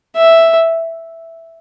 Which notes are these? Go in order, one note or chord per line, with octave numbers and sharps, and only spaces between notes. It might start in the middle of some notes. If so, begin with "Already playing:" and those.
E5